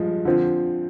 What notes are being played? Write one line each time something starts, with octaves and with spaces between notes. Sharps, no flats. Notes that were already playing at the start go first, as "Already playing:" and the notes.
Already playing: G2 F3 G#3
D3 F3 C4